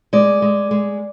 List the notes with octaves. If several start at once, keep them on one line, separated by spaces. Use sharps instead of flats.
G#3 D5
G#3
G#3